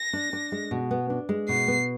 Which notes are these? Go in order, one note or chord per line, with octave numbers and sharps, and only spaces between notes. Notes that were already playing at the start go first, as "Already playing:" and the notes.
Already playing: A#6
D4
D4
G#3
B2
B3
D4
G#3
B2 C7
B3